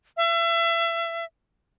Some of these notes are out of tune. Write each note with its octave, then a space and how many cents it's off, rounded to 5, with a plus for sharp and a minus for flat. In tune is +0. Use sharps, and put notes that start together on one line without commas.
E5 +30